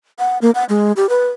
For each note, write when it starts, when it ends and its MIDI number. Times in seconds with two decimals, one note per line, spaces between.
0.19 0.38 78
0.42 0.51 58
0.55 0.64 78
0.69 0.92 56
0.96 1.09 67
1.09 1.29 71